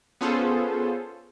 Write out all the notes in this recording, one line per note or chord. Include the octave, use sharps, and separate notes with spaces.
B3 C#4 F4 G#4 A4 C5